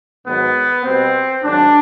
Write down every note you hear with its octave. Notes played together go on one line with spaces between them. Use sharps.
G#2 D#3 F#3 B3
B2 G3 B3 C4
G#2 D#3 F#3 D4